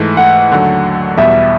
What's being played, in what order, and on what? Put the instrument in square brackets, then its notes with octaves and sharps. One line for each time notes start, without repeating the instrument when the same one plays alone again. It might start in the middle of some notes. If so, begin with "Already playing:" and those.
Already playing: [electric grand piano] G#2 E3 A3
[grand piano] F#5
[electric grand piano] D#2 D3 F#3 A3
[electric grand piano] E2 B2 G3 B3 [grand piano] E5